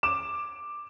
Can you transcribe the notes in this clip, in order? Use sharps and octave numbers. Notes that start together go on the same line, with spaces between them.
D6 E7